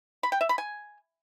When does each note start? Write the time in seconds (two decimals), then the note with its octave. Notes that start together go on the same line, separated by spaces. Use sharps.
0.23 B5
0.32 G5
0.41 E5
0.49 B5
0.58 G#5